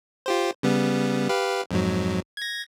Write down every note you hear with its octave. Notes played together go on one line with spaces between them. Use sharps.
F4 G4 C5
C#3 G3 B3
G4 B4 F5
F2 G#2 F#3
G#6 A#6